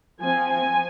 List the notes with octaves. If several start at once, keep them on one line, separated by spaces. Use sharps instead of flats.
F3 C4 G#5
G#5